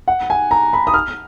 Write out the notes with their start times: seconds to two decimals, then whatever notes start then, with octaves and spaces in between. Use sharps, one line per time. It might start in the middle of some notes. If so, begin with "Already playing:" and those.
0.08 F#5
0.30 G#5
0.51 A#5
0.73 B5
0.87 D#6
0.94 F6